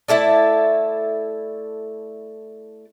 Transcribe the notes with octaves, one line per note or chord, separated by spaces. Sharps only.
A3 E4 A4 D5